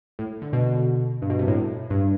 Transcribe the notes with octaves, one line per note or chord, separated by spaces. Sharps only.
A2
D3
B2
G2
B2
C3
A2
G2